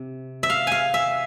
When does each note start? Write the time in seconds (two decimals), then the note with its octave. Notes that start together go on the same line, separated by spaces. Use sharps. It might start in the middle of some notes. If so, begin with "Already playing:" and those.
Already playing: C3
0.43 E5
0.50 F5
0.67 F5 G#5
0.94 E5